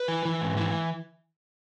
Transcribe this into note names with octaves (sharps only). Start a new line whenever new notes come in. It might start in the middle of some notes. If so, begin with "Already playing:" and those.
Already playing: B4
E3
E3
G#2
E3